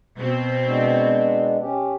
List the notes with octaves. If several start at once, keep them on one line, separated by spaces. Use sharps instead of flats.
B2 C4
G#3 B3 D4
C#4 G4